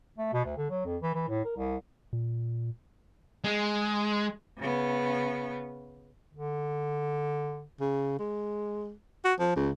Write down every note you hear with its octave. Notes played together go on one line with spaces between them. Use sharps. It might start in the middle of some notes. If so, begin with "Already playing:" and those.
A3
B2
D2
D3
F#3
F2
E3
E3
A2
A#4
C2
A#2
G#3
C#3 B3
D3
C#3
G#3
F#4
F3
C#2